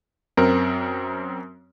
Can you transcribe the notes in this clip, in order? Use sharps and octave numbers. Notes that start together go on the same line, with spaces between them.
F#2 C4 A#4